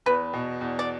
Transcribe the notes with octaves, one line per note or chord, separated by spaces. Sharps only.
E2 B4
B2
E2
D5